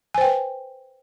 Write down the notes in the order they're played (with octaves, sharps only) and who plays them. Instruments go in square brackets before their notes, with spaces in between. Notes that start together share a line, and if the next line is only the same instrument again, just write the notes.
[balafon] G#5
C5
G5
B4